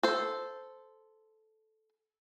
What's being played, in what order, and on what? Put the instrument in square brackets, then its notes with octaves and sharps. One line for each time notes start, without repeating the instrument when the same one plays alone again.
[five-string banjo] A4 C5